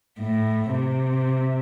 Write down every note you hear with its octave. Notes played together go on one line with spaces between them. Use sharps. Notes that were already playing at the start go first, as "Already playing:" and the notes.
A2
C3